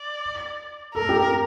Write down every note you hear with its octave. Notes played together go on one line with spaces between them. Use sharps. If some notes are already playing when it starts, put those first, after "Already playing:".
Already playing: D5
A4 A#4
G4